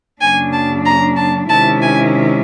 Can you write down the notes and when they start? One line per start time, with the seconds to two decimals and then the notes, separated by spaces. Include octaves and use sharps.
0.21 F#2 C#3 F#3 A#3 D4 G#5
0.53 A5
0.85 A#5
1.17 A5
1.49 C3 D#3 G#3 C#4 E4 A5
1.82 G#5